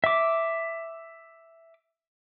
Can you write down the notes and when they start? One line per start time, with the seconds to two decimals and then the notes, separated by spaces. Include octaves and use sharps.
0.04 E5 D6